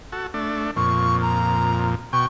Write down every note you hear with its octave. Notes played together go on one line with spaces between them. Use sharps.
F#4 A4
A3 D4
F2 A#2 C#6
A#5
B2 G5 C#6